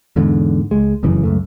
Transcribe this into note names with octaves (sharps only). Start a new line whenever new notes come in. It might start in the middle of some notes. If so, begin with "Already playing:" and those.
E2 G#2 D3
C#2 G#3
F1 F#2 C#3 E3
C#2 F#2 A3